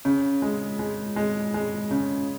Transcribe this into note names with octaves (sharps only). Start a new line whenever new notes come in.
C#3
G#3
G#3
G#3
G#3
C#3